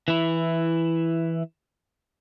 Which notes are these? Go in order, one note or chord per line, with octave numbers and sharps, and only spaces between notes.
E3 E4